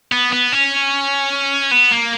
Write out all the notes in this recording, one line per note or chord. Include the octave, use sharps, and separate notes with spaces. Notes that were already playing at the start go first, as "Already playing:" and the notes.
B3
B3
C#4
B3
A#3